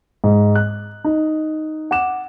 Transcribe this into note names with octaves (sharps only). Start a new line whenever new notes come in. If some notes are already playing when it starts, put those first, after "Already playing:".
G#2
F#6
D#4
F#5 D6 E7